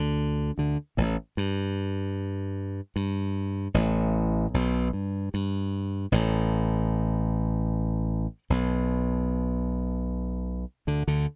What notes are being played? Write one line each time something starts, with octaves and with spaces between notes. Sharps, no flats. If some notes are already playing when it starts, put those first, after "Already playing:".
Already playing: D2 D3
D2 D3
A1 A2
G2
G2
A1 A2
B1 B2
G2
G2
A1 A2
B1 B2
D2 D3
D2 D3